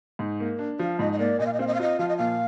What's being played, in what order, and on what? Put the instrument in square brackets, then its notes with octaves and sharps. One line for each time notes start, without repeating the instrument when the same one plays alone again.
[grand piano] G#2
A#3
D4
[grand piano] F3 [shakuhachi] F5
[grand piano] G#2 [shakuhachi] D#5
[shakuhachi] D#5
[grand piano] A#3 [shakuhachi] D5
[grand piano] A#2 [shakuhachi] D#5
[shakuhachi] F5
D#5
[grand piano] C4 [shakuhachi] F5
[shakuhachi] D#5
F5
[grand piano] F4 [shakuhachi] D#5
[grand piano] F3 [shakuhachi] F5
[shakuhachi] D#5
[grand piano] A#2 [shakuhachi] F5